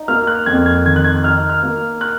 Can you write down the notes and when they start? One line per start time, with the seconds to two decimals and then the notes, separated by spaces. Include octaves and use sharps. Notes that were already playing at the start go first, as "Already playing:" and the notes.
Already playing: D#4
0.08 A#3 F6
0.27 F#6
0.46 F2 G#6
0.66 G#6
0.85 D#3 G#6
0.96 F#6
1.04 G#6
1.24 D#4 F6
1.50 F6
1.63 A#3
2.01 F#6